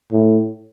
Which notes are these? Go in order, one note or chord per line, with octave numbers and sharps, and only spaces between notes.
A2